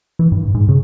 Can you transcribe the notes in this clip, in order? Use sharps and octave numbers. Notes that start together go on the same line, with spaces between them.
E3
G2
G#2
C#3